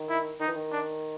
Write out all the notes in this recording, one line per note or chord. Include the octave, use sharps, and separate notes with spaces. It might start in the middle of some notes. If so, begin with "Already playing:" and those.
Already playing: D#3
E4
D#3 D#4
E3
D#3
D4